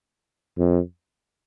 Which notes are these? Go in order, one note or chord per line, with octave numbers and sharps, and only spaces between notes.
F2